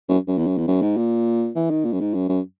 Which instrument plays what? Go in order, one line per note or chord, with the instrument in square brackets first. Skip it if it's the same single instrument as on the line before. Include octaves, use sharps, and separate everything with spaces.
[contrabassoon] F#2
F#2
E2
F#2
E2
F#2
G#2
A#2
E3
D#3
A#2
F#2
G#2
F#2
F#2